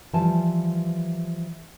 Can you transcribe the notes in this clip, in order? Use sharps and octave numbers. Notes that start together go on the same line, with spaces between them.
E3 F3 G3 G#5 A5